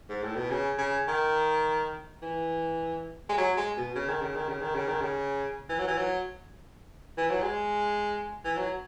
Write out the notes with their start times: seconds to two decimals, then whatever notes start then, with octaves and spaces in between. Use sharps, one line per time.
0.10 G#2
0.23 A2
0.36 B2
0.50 C#3
0.78 C#3
1.08 D#3
2.23 E3
3.29 G#3
3.38 F#3
3.57 G#3
3.77 B2
3.96 C#3
4.09 D#3
4.22 C#3
4.36 D#3
4.48 C#3
4.62 D#3
4.75 C#3
4.88 D#3
5.01 C#3
5.70 E3
5.79 F#3
5.88 E3
5.98 F#3
7.18 E3
7.30 F#3
7.42 G#3
8.45 E3
8.57 F#3